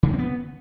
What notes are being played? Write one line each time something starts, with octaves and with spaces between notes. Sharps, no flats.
C#3
D#3
C4
B3